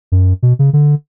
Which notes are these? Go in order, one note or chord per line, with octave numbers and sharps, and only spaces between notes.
F#2
B2
C#3
D3